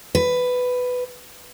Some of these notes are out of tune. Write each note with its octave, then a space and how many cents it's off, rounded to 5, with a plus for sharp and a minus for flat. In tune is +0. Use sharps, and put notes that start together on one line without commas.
B4 +10